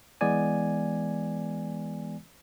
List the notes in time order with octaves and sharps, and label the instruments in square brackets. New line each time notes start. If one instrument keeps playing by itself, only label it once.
[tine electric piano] E3 G#3 B3 D5 G#5